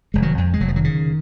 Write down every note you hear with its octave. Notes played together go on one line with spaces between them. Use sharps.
F1 G#3
D#3 F#3
F2
G#3
F1 F#3
F3
D#3 F#3
C#3